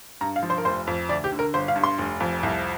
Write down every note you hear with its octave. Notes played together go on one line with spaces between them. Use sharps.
G2 A#5
F5
F3
C5
A#4
F1 C5
F2
D2 D5
G4
D3
A#4
G1 C5
F5
G2
C6
F1
F2
C2